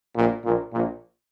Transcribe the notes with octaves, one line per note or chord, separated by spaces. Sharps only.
A#1 A#2
A#1 A#2
A#1 A#2